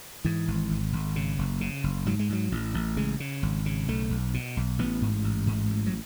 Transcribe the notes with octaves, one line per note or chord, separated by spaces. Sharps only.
G#2 E3
G#1
G#1
G#1
C#3
F#1
C#3
F#1
G#2 F#3
G#3
G#2 F#3
A1
A1
C#3 G#3
C#3
G#1
C#3
B1 A3
B1
B2
B1
A1 B3
G#2
A1
G#2
A1
F#3